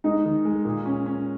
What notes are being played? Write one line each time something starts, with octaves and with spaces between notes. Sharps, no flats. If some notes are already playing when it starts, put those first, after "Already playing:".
G#3 D#4
D#3
G#3
A#2
C#4
C#4